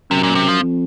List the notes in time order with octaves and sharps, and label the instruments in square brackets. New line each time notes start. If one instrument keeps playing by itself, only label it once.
[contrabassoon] F#2 [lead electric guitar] C3
[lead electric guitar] A#2
C3
F3
[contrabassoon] F2